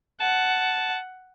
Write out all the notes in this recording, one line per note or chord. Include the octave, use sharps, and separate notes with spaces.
F#5 A5